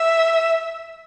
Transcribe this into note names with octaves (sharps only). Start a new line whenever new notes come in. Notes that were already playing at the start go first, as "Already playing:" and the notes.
Already playing: E5